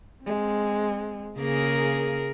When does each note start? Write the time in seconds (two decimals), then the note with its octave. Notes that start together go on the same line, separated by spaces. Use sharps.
0.24 G#3 C4
1.38 C#3 A#3 G#4 A#4